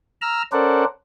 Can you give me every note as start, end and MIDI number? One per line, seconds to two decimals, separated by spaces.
0.22 0.42 82
0.22 0.42 88
0.22 0.42 89
0.52 0.85 61
0.52 0.85 69
0.52 0.85 70
0.52 0.85 72
0.52 0.85 74
0.52 0.85 78